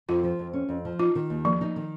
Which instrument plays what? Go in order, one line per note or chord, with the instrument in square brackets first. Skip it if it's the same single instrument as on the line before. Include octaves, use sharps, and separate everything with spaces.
[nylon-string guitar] F2 [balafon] F4
[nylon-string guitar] F3
F2
C#4
F2
F3
[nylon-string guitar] D#4 [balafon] F4
[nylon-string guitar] D#3
D#2
[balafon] F3 [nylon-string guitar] A#3
[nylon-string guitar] D#4
D#3